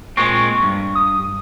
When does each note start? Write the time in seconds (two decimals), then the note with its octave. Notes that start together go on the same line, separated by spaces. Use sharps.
0.17 A#2 G#3 C4 C#6
0.63 G2
0.95 D#6